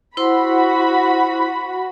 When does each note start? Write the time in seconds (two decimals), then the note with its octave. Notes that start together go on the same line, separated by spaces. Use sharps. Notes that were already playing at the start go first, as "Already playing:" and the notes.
0.17 E4 F#4 C5 B5 C6